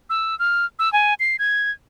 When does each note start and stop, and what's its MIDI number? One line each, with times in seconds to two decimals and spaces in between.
0.10 0.37 88
0.39 0.65 89
0.79 0.92 88
0.93 1.14 80
1.20 1.36 96
1.39 1.71 92